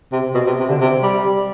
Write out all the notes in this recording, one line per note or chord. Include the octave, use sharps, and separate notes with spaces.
C3
B2
C3
C3
D3
C3
G3